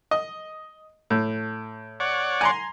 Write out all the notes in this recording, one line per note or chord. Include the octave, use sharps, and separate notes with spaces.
D#5
A2
C#5 D5 F#5
G#5 A#5 C6